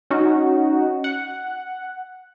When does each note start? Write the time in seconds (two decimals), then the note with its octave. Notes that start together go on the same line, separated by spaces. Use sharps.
0.10 C#4 D#4 F#4
1.04 F#5